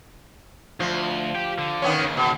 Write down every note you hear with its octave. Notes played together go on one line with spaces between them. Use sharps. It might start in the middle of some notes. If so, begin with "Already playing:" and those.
D2 F3
G4 G5
D3
D#3 B3 C#4
D#2 C#3
B2